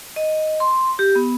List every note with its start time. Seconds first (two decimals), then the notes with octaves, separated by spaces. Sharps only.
0.16 D#5
0.60 C6
0.99 G4
1.15 B3